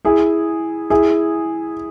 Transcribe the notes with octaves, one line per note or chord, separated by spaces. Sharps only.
E4 G#4
E4 G#4